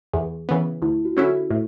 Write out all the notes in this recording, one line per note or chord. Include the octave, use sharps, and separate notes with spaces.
E2 G#4
C#3 E3 B3
D2 E4
F#4
D3 F#3 C#4 E4 G#4
F#4
A2 E4